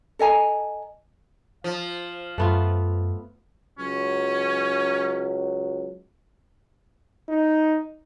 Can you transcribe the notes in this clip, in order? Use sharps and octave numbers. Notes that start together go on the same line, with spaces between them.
A4 D#5 G#5 A#5
F3 F5
F#2 A3 B3 F4
C#2 F#3 C#4
D#4